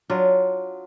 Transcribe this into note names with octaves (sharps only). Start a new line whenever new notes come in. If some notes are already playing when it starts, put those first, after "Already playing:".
F#3 D4 F4